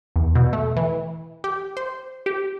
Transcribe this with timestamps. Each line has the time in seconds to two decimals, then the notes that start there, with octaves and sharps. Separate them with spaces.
0.16 E2
0.35 B2
0.53 A3
0.77 E3
1.44 G4
1.77 C5
2.26 G4